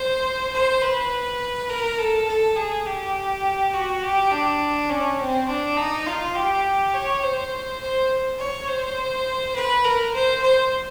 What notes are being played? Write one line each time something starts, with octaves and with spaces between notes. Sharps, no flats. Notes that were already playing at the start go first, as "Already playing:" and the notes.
Already playing: C5
C5
B4
A#4
A4
A4
G#4
G4
F#4
G4
D4
C#4
C4
D4
D#4
F4
G4
C#5
C5
C5
C#5
C5
B4
A#4
C5
C5